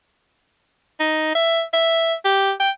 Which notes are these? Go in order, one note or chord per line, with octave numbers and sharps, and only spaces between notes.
D#4
E5
E5
G4
G5